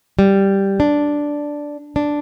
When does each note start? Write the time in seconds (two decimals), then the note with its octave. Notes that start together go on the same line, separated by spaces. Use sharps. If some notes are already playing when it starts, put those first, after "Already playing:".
0.19 G3
0.80 D4
1.96 D4